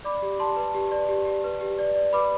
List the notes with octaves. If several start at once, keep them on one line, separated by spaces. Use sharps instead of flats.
D5 B5 D6
G4
G4 A5 C6
B4
G4
D5
G4
G4
B4
G4
D5
D5
B4 B5 D6